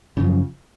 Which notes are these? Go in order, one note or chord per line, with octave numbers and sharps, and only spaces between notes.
F#2 C#3 F3